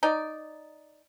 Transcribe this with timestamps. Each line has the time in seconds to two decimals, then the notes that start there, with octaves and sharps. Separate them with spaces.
0.03 D#4 D5